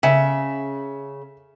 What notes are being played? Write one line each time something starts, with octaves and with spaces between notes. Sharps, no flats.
C#3 E5